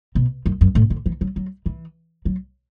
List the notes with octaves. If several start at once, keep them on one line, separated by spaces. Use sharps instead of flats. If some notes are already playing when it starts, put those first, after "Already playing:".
B2
F#2
F#2
A2
D3
E3
F#3
F#3
E3
F#3